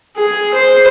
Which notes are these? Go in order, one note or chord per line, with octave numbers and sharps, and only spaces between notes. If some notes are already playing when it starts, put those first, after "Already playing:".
G#4
C5